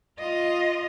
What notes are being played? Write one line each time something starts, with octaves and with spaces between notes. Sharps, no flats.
F4 D#5